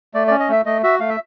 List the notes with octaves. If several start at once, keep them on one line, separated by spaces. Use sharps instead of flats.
A3 D5
C#4 D5
D#5
A3 E5
A3 D#5
F#4 E5
A3 F5
E5